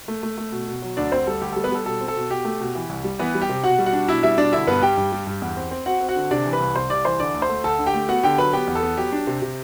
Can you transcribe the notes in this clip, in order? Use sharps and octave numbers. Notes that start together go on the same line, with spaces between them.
A3
A3
A3
B2
B2
F#3
D2 D4 D5
D2 C4 C5
G3 A4
D2 G4
G3 A4
B3 B4
G3 A4
B2 A4
C4
A4
B2
B2 G4
A3
B2
E3
C2
G3
E3 B3 B4
G3
G4
C3
B2 F#4 F#5
G3
F#4 F#5
D4
B2 E4 E5
G3 E4 E5
B2 D4 D5
D3 E4 E5
G2 B3 B4
G3 G4 G5
G2
G3
G2
E2
C4
C4
C4 F#4 F#5
C4
F#4 F#5
D3
C3 D4 D5
E3
B4 B5
C2
C3 C5 C6
C2 D5 D6
E3 C5 C6
D3 D5 D6
D2
C5 C6
A3
D2 A4 A5
D3
G4 G5
A3
B3 F#4 F#5
D3 G4 G5
F#3 B4 B5
B3 G4 G5
E2
A4
B3
F#3 G4
D4
C3
C3